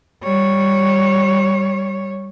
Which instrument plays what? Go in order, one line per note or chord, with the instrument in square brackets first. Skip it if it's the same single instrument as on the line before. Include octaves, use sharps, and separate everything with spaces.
[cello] G3 C#5